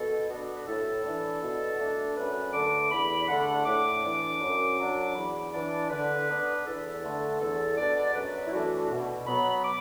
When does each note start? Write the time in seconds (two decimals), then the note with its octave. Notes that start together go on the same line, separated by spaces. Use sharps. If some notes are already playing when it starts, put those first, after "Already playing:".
Already playing: B2 A4
0.29 B3 D4 F#4
0.55 B4
0.66 A2 A4
1.03 E3 D4
1.41 B2
1.78 A3 D4
2.16 F#2 B4
2.53 D3 A3 D4 D6
2.91 E2 B5
3.28 D3 A3 D4 F#5
3.66 A2 D6
4.03 E3 D4
4.41 F#2
4.78 F#3 D4
5.15 E2 B5
5.53 E3 D4 D5
5.90 D3 B4
6.28 B3 D4
6.65 E2 A4
7.02 D3 A3 D4
7.40 E2 A4
7.77 B2 B3 D4 D5
8.15 F#2 B4
8.46 E4
8.52 E3 A3 D4 F#4
8.90 B2
9.27 F#3 B3 B5
9.65 D6